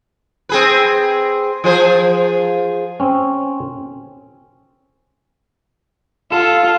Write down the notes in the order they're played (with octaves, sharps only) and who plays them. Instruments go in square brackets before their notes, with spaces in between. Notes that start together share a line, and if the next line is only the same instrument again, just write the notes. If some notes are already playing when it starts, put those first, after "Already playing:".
[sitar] C4 G#4 B4
F3 G#4 C5
[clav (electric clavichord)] C4 C#4
[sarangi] F4 [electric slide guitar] A4